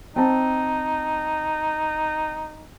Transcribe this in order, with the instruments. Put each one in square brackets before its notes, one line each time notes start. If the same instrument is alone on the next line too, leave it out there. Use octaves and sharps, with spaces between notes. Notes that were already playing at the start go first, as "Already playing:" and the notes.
[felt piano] C4 A5 [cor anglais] D#4